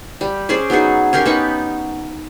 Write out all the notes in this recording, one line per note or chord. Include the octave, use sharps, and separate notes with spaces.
G3
C#4 G#4 C5 D5
F#3 B3 D#4 G#4
C#4 G4 A#4 C6
B3 D#4 B5 C#6